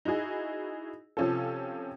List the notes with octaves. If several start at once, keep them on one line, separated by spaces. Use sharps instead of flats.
D#4 E4 F#4 G#4 D#5
C3 F3 C#4 F4 A4